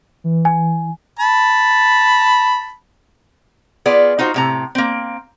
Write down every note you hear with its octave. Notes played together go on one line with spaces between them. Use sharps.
E3
E3 G#5
A5 B5
B3 F4 G#4 D5
D#4 F4 F#4 C5
A2 C3 A#5
A#3 C4